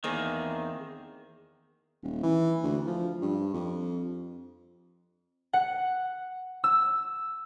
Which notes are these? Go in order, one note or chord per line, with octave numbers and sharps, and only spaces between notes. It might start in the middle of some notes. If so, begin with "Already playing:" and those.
E2 D#3 A#3 C4 G#4
D#1
E3
D2
F3
G2
F2
F#5
E6